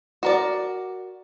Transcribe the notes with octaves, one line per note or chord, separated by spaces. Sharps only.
F#4 A#4 D5